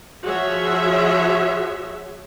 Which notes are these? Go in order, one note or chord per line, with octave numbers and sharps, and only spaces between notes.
F3 F#4 G#4 C#5 E5